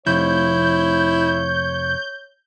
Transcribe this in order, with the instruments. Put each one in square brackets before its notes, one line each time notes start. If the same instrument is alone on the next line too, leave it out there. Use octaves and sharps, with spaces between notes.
[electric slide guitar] F2 C3 [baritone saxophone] E4 [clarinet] C#5 [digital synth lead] G6